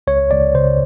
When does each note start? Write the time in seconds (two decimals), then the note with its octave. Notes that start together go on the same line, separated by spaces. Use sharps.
0.07 C#2 C#5
0.31 C#2 D5
0.55 C#3 C5